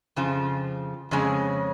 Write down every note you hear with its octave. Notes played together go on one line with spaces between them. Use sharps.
F2 C#3 F3
F2 C#3 G#3 C#4 G#4